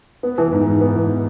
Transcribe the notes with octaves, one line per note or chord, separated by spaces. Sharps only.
B3
E3
G#2
G#2
B3
E3